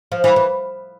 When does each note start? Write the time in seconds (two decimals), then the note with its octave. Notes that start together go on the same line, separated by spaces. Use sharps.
0.12 F3
0.24 E3
0.36 E3